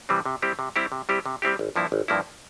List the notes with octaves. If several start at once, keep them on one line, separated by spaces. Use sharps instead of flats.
C3 E3 G3 C4
C3
G3 C4 E4 G4
C3
G3 C4 E4 G4
C3
G3 C4 E4 G4
C3
G3 C4 E4 G4
G#1
G2 F3 A#3 E4
G#1
G2 F3 A#3 E4